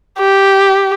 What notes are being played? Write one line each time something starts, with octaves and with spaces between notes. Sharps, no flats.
G4